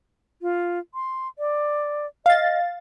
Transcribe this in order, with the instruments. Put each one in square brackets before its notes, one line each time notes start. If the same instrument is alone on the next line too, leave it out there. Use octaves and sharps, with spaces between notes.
[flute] F4
C6
D5
[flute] D#5 [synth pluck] F5 A6